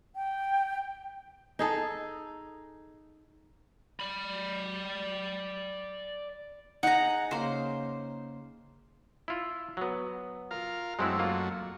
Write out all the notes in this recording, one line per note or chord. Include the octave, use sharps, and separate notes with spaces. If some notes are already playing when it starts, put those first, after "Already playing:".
G5
D#4 G#4 A4
D5 B5
D#4 G#4 F#5 A#5
C#3 A#3 C5
E4 F4
F#3 B3
F4 A#4 F5
F#2 F#3 G#3 A3 C4 E4
A#3 F4